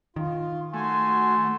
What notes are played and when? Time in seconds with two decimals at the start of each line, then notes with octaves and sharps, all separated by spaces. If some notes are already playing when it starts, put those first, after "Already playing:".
0.16 D#3 F4
0.74 A3 F#4 G#5 C6